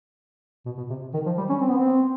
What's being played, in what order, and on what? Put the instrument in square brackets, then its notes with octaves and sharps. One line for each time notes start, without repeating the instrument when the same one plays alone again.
[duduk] B2
B2
C3
D#3
F3
G3
C#4
C4
B3
C4